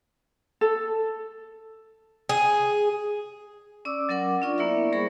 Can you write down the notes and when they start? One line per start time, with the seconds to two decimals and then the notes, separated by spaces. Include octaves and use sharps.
0.61 A4
2.29 G#4
3.85 C#4 D5 D6 E6
4.09 F#3 C#4 A#4 F#5 D6
4.42 D4 F4 D5 C#6
4.58 A#3 B3 E4 A#4 D5 E5
4.92 G3 A#3 G#4 C5 B5 C#6